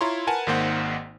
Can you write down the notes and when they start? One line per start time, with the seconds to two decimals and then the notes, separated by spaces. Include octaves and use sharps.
0.01 E4 F4 C#5 A#5 C6
0.27 A#4 B4 F#5 G#5 A5
0.47 G#1 G#2 D#3 A#3 C5 F#5